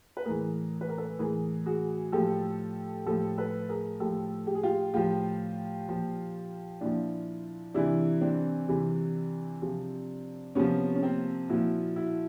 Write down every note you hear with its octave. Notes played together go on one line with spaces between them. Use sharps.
B4
A2 E3 G#4 A#4
B4
A#4
A4 B4
A2 E3 G#4 A#4
F#4 G#4
A2 F3 G4 A4
A2 F3 G4 A4
A4 B4
G#4 A#4
A2 F3 G4 A4
G4
G#4
F4 G4
A2 F3 F4 G4
A#2 F3
A#2 F3 D4 E4
C3 E3 D4 E4
C4 D4
C3 E3
C3 F3
C3 F3 B3 C#4
C#4
A#3 C4
A#2 F3 E4 F#4
E4 F#4